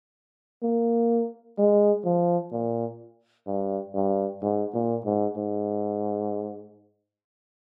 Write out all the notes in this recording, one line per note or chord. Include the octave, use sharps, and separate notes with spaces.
A#3
G#3
F3
A#2
G2
G2
G#2
A#2
G#2
G#2